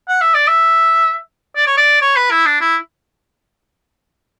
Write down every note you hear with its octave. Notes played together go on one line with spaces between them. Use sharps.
F#5
E5
D5
E5
D5
C#5
D5
C#5
B4
E4
D4
E4